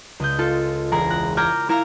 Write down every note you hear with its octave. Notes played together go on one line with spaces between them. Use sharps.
C#2 D#5 G6
F4 A4
E1 G#4 A#4 A#5
F#6 A#6
A#5 D6 F6 G6 G#6 A#6
E4 A#4 F5 A#5 F6